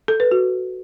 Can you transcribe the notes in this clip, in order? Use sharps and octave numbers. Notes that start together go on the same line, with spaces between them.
A4
B4
F#4